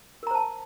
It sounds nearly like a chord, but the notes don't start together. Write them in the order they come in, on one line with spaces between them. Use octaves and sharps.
A#4 A#5 C5 A5